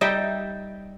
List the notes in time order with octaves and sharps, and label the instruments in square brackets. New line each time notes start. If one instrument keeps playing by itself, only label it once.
[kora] G3 D#4 E5 G5